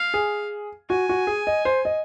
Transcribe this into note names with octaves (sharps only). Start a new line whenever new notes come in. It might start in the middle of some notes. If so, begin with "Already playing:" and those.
Already playing: F5
G#4
F#4 G#5
F#4
G#4
D#5
C5
D#5